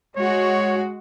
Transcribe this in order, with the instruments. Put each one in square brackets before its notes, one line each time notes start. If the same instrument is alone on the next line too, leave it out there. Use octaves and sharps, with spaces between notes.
[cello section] G#3 F#4 [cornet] C#5